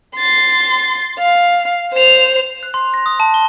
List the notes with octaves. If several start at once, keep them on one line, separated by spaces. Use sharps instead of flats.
C6 A6
F5
C5 F7
F#6
C6
A#6
D#6
A5
G7